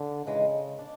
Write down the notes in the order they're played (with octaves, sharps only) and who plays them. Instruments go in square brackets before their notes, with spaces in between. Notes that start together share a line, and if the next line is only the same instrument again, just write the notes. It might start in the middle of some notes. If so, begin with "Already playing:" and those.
Already playing: [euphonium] D3
[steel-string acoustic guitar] G#2 E3 G#3 [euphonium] C#3
[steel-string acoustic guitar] D4